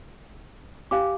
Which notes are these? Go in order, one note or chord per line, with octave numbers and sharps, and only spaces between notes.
G4 F5 G#5 D6